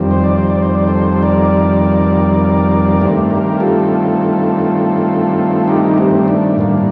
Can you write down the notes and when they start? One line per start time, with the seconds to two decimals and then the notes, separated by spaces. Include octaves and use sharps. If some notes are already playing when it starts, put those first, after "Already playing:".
Already playing: F2 D#3 G3 C4
0.11 C5
0.24 D5
0.37 C5
0.50 D5
0.62 C5
0.75 D5
0.87 A4 C5
1.23 A#4 D5
3.00 G2 D#3 A3 C4
3.30 G4 A#4
3.60 F4 A4
5.68 D#4 G4
5.98 C4
6.28 D4
6.58 A2 G3 A#3